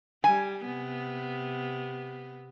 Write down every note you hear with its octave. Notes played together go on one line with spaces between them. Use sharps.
G3 G#5
C3 B3